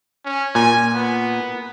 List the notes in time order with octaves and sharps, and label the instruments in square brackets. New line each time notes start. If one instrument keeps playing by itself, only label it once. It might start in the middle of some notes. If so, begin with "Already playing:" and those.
[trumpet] C#4
[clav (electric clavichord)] A#2 [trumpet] G#5
[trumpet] B3